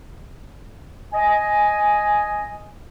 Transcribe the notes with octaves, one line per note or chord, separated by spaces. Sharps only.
D#5 G#5